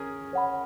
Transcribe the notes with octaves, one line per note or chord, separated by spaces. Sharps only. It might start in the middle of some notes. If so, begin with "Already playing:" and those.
Already playing: C#4 G#4 A#4
C#5 F#5 B5